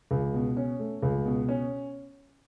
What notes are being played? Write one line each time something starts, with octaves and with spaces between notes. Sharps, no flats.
C#2
B2
C#4
A3
C#2
B2
C#4